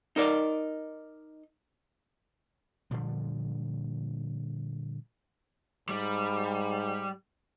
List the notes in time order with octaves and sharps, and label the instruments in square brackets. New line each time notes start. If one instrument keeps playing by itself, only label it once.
[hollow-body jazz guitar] D#4 A#4 D5
[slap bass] A#2 D3 F3 G3
[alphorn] G#2 [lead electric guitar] G3